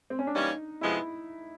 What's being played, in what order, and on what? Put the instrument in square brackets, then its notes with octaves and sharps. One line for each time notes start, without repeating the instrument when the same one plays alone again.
[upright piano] C4
C#4
D4
[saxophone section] E3 G3 A#3 C#4 [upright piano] D#4
[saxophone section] C3 F3 G#3 B3 [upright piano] E4